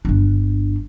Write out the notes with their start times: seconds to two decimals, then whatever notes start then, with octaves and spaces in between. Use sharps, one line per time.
0.05 G1 D4